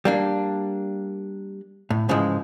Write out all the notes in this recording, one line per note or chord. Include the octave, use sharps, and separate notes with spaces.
G3 A#3 D4
A2
G#2 C#3 E3 F3 G#3